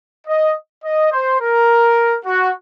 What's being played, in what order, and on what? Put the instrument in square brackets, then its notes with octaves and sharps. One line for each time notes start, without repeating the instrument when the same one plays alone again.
[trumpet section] D#5
D#5
C5
A#4
F#4